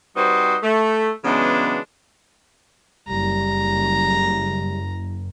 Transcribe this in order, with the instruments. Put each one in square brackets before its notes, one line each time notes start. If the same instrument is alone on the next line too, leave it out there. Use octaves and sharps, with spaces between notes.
[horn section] G3 C4 D#4 F#4 B4 C5
A3
C#3 E3 F#3 G#3 B3 D4
[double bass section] F#1 [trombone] G3 [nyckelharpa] A#5